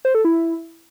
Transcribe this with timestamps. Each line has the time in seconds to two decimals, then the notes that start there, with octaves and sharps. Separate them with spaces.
0.05 C5
0.15 A4
0.25 E4